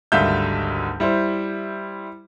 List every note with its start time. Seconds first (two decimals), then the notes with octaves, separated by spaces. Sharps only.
0.12 G#1 D2 G3 E5 F5 G6
1.00 G3 E4 C5